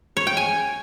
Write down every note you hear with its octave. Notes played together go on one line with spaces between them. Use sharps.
C#5
G5
G#5